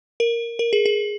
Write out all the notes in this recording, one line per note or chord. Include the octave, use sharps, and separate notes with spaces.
A#4
A#4
G#4
G#4